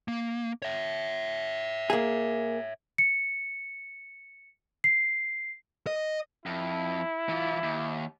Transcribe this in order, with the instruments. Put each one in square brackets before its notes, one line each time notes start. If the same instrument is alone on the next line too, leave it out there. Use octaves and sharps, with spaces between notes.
[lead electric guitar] A#3
C#5 E5
[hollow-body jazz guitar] A#3 G#4
[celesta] C#7
C7
[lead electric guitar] D#5
[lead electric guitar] F2 [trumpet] E4
[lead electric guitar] E3 F4
D#2